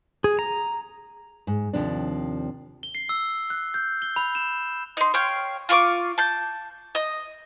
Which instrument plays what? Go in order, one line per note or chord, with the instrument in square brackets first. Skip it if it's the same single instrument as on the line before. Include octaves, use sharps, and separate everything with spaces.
[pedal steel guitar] G#4
A#5
[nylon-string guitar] G#2
D#2 C3 F3 D4
[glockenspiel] G7
C7
E6
F#6
G6
G7
B5
E7
[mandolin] D#4 C6
C#5 F5 G5
F4 F5 C#6 D6
A5 G6
D#5